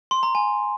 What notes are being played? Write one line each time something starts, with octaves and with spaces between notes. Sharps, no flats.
C6
A#5
G#5